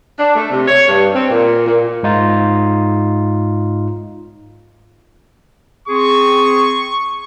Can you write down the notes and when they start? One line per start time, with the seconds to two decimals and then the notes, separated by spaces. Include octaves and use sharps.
0.18 D4
0.36 A3
0.51 C3
0.68 C#5
0.87 G2
1.14 C4
1.31 A#2
1.67 A#2
2.03 G#2 D#4 F4
5.88 C4 G#4 C#6